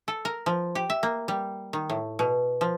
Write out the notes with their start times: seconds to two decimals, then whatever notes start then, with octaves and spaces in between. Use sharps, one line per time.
0.08 A4
0.25 A#4
0.46 F3
0.75 G4
0.90 E5
1.03 A#3
1.28 G3
1.73 D#3
1.90 A2
2.19 B2
2.61 F3